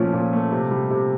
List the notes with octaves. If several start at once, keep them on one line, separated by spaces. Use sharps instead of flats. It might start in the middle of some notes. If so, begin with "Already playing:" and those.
Already playing: A#2 F3 A3 C#4
A#2
A3
C3
G3
C3